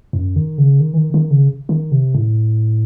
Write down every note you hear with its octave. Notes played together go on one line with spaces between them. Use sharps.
F#2
D#3
C#3
D#3
E3
D#3
D#3
C#3
D#3
C3
A2